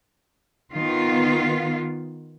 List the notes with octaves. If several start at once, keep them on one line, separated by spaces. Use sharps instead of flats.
D#3 B3 F4